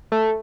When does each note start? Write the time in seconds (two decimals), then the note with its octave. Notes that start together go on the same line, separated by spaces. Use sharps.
0.12 A3